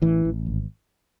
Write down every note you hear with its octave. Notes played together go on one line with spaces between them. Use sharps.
A1 E3
A1
G#1